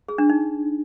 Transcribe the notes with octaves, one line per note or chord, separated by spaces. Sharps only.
G#4
D4
D#4